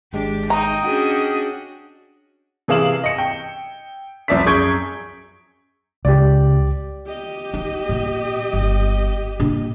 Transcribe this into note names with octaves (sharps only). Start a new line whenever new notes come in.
G#1 G#3 D4 G4
D#4 D#5 G5 A#5
C#4 D4 F#4 G#4 F#5
C3 E3 G#4 F5 E7 F#7
D#5 C#7
G5
C2 F3 D5 E5 B6
F#2 G#4 C#6 G6 G#6 D7
C#2 G4 D5
G4 D#5
D#4
A#2
G1
A#2 D4